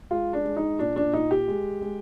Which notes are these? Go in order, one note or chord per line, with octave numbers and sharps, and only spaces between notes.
G#3 F4
D4
G#3
D#4
A#2 D4
D4
A#2 D#4
G4
G#3
G#3